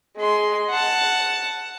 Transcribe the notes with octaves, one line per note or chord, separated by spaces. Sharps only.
G#3 C6
F#5 A5